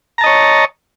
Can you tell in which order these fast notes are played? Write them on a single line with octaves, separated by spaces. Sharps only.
A#5 A5 D#5 C#5